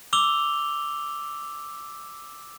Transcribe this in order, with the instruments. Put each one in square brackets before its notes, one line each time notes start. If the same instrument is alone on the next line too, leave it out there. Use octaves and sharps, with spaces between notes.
[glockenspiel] D6 E6 F7 G7